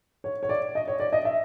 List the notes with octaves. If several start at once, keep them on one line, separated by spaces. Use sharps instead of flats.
C#5
C#5
D5
D#5
C#5
D5
D#5
E5